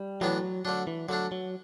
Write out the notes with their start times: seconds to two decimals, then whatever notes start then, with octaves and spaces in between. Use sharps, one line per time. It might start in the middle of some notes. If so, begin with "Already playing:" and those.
Already playing: G3
0.21 A2 E3 F#3 B3 D4
0.65 D3 F#3 A3 D4
0.87 E3
1.09 D3 F#3 A3 D4
1.32 F#3